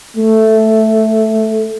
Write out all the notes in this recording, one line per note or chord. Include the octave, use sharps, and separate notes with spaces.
A3